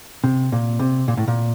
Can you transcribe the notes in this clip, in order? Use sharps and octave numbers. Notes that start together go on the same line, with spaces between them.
C3
A#2
C3
A#2
A2
A#2